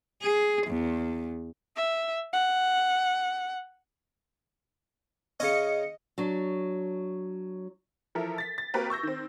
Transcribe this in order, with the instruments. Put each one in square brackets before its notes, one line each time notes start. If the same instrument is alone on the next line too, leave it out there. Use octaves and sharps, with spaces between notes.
[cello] G#4
E2
[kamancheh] E5
F#5
[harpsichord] C#3 C#4 [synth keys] D#5 C#7
[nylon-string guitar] F#3 D4
[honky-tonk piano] E3 F3 A4 A#4 E5
A6 B6
A6
A#3 C4 F#4 G4 A#4 B4
C#6 E6 G6 A#6
D#3 C4